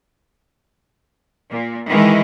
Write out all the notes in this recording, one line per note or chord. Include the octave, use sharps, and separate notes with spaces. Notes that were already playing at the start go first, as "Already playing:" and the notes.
A#2
D#3 E3 G#3